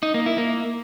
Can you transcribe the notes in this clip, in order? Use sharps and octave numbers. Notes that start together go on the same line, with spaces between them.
D#4
A#3
E4
A#3